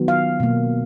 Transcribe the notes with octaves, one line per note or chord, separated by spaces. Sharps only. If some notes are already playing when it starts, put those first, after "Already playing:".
Already playing: D#3 F#3 B3
F5
B2 A#3